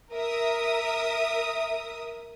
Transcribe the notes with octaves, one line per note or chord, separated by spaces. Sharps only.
A#4 E5 D#6